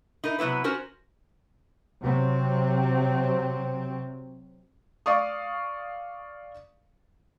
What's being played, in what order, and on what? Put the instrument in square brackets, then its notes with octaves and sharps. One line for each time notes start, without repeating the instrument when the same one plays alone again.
[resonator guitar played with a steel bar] D#4 E4 A#4
C3 F#3 B3 E4 B4
C#4 F#4 A#4 C5
[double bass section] C3 F#3 C4
[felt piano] D5 F5 C#6 D#6